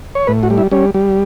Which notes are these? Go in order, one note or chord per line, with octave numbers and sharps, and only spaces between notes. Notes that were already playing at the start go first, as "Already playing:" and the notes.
C#5
A2 B4
F#4
G3
E4
G3 C#4
G3